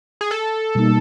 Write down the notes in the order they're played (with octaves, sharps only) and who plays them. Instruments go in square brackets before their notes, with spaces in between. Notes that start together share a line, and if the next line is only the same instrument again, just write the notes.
[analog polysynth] G#4
A4
[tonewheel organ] B2 G3 A#3 D#4